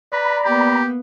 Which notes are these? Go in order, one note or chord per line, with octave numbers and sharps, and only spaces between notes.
B4 D5 A#5 B5
A#3 B3 G4